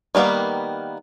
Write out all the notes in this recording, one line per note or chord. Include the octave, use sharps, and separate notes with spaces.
D#3 G3 A#3 B3 F5